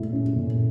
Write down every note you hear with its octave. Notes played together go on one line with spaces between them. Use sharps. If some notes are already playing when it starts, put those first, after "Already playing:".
Already playing: A#2 A3 E4
C#4
A#2